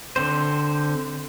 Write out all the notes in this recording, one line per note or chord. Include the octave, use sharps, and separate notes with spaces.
D3 C4 C5